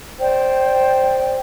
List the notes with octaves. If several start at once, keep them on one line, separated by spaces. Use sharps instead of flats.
C5 D5 G5